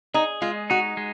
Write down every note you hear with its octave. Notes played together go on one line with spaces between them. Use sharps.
D#4 G#4
G#3 F4
D#4 F#4
G#3